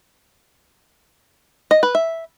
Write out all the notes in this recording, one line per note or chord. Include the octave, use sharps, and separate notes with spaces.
D#5
B4
E5